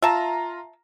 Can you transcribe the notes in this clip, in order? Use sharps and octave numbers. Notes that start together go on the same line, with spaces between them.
F4 E5 A5 A#5